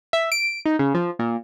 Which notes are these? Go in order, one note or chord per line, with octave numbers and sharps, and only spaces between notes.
E5
D7
D#4
C#3
F3
A#2